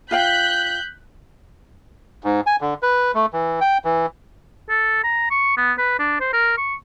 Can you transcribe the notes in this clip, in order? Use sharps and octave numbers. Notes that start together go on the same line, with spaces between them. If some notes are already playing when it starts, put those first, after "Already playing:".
F4 F5 G5 F#6 G6 B6
G#2
G#5
D3
B4
A3
E3
G5
E3
A4
A#5
C#6
B3
B4
D4
C5
A#4
C#6